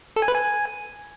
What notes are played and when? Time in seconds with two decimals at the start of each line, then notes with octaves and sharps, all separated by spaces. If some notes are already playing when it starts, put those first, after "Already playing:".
0.16 A4
0.22 G#5
0.28 B4
0.34 G#5